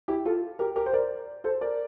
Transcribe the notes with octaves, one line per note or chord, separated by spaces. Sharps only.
E4 G4
F4 A4
G4 A#4
G4 A#4
C5
A#4 D5
A4 C5
A#4 D5